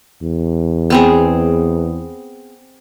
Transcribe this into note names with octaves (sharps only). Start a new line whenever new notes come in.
E2
B3 C4 G#4